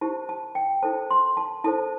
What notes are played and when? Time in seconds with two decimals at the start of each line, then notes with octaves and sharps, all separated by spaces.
0.01 E4 G4 C5 A5
0.29 A5
0.55 G5
0.83 E4 A4 C5 A5
1.10 C6
1.37 A5
1.64 E4 A4 C5 A5